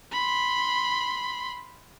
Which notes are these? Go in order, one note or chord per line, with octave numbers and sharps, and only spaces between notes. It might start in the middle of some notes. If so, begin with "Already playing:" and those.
B5 C6